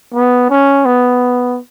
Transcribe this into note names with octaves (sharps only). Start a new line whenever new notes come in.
B3
C#4
B3